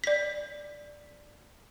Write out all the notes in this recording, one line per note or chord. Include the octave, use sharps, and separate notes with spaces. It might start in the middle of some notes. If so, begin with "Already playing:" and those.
D5 B6